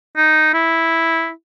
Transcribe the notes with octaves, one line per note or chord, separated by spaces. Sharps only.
D#4
E4